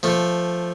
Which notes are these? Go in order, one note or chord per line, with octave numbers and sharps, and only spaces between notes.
F3 A3